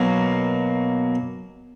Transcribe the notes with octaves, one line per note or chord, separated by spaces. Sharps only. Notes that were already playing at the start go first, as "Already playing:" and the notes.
Already playing: B2 F#3 A#3